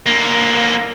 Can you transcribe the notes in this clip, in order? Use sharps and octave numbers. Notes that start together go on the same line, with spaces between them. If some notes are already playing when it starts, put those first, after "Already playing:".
D3 A#3